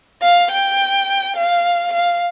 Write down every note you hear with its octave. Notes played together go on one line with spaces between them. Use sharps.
F5
G5
F5
F5